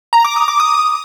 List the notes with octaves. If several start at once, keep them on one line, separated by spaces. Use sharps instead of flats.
A#5
D6
D#6
D6
D#6